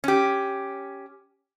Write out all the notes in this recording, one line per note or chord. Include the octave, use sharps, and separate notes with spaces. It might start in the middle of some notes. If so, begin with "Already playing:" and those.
C#4 G4